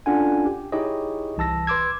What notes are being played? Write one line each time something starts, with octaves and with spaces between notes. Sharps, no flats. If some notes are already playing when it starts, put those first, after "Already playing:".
C#4 D4 F4 A4 F#5 G#5
G4
D#4 E4 G4 G#4 C#5 D#5
C2 E3 A5 E6 A#6
B4 C6 D6 E6 G#6